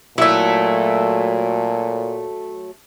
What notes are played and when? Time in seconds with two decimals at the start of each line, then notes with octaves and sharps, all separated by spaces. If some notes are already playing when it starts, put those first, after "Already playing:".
0.18 A#2 F#3 A3 E4 E5